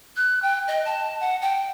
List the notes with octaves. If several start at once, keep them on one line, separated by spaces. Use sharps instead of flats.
F#6
G5
D#5
A5
F#5
G5